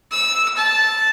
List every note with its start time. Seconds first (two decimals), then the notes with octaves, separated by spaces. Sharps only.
0.11 E6
0.56 A5